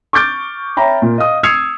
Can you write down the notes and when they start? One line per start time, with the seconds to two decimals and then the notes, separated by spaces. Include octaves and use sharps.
0.13 C#6 D6 F6 G6 A6 D7
0.77 C#5 E5 G5 A#5 B5
1.02 A#2
1.18 D#5 F5 D#6
1.43 D#6 E6 G#6 C7 C#7 F7